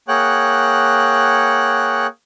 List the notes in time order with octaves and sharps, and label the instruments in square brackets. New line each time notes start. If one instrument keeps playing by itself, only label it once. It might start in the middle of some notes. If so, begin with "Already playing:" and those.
[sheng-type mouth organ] A#3 G#4 C#5 F#5 G5 F#6